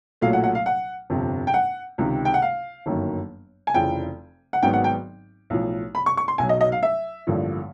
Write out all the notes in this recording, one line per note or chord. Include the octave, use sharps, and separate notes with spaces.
B1 A#2 F#3 A3 F5
F#5
F#5
F5
F#5
G1 F2 C3
G5
F#5
C#2 C3 D#3
G5
F#5
F5
G1 F#2 D#3 F#3 A#3
G#5
F1 F2 C#3 E3 G5
F#5
G#1 G#2 D#3 F#3 B3 G5
F#5
G5
B1 A2 F3
B5
C#6
C#6
C6
B1 B2 F#3 G#5
D#5
D#5
F5
E5
A1 G2 D3 F3 A#3